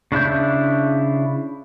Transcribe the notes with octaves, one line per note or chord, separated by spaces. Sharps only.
C#3 D4 E4 G6